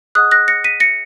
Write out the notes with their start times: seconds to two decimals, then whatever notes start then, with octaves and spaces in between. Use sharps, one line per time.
0.15 G#4 D#5 F#5 D#6 F#6
0.31 F#6 A#6
0.48 A#6 C#7
0.64 B6 D#7
0.80 A#6 C#7